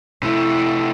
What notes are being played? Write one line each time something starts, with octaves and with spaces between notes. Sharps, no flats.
C3 A3 E4